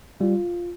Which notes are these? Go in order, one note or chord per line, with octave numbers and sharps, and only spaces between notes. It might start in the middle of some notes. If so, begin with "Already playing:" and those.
G3 F4